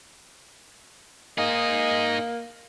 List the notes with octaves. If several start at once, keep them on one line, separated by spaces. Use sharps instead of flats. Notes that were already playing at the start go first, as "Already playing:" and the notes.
A#3 D#4 G#4 D#5